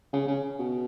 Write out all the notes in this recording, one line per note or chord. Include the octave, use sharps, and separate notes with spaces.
C#3
C#3
B2